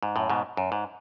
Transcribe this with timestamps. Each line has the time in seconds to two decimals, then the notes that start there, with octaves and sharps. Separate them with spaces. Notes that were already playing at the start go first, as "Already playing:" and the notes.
0.03 G#2
0.16 F#2 A2
0.30 G#2 B2
0.57 F#2
0.72 G#2